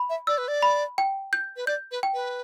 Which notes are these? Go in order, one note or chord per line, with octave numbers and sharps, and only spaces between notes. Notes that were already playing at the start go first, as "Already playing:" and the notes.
Already playing: B5
E5
D5 E6
B4
D5
B5
G5
G6
B4
D5 G6
B4
G5
B4